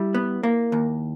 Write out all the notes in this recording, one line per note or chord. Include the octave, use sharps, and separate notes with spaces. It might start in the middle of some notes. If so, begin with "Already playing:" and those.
Already playing: G3 E4
B3
A#3
D#2